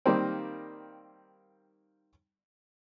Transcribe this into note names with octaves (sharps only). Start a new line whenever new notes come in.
D#3 G3 A#3 C4